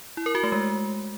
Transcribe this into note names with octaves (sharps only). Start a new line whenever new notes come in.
E4
A#4
F#4
A3
G#3